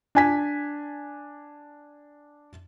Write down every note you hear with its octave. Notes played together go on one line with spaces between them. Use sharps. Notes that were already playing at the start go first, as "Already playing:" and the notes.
D4 G#5 B6